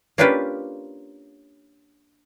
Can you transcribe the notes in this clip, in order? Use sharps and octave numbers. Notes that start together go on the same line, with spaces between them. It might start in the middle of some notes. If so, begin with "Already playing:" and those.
A#3 C#4 D4 F4 G4 B4